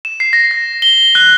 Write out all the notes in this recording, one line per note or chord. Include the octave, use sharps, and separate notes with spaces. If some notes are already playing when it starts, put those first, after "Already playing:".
E7
C7
A#6
A#6
G7
F#6